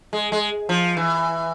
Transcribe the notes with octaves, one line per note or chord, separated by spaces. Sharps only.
G#3
G#3
F3
E3